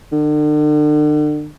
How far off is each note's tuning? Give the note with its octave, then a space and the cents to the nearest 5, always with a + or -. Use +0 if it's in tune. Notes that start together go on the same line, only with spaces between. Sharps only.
D3 +40